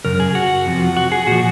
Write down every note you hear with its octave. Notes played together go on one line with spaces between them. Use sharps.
F#2 C#3 A#4
G#4
F#4
F2 C3 F3
F#4
G#4
A#2 F3 F#4